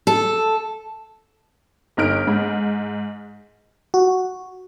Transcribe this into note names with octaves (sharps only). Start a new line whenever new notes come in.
A4
G1 D#4 F6 D7
G#2
F#4